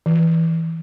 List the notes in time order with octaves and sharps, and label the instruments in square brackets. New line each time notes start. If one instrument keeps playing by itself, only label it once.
[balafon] E3